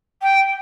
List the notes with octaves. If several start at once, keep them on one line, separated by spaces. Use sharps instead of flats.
G5